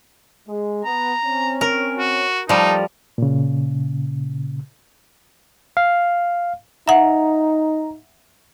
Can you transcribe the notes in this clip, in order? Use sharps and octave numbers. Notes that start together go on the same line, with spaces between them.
G#3
B3 A#5
C4 C#4
A#4
F#4
A2 F3 G3 D#4 A5
A#2 C#3
F5
D#4 E5 F#5 A#5